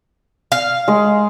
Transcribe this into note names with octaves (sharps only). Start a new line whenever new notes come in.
F5
G#3